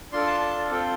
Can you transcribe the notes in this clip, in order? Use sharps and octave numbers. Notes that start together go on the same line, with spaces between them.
D4 F4 A4 C6
A5
A5
C4 F4 A4